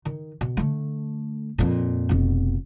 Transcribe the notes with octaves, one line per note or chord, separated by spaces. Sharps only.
D#3
B2
D3 A3
F2 A#2
F1 B2